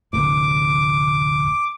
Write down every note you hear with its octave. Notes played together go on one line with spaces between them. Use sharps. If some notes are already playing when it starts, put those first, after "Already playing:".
F1 D2 A2 D6